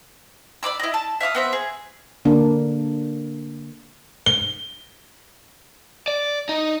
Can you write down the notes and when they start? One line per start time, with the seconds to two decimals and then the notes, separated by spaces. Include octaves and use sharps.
0.63 D5 B5 D6 E6
0.79 E4 D#5
0.94 A5
1.20 E5 F5 D6 D#6
1.35 B3 C4 E5
1.53 G#4
2.25 D3 A#3 D4
4.26 G7
6.08 D5
6.49 D#4